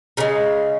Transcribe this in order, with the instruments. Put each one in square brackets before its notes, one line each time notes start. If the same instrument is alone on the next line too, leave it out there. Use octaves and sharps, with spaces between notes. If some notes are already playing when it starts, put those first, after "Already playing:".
[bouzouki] C#3 G#3 A#4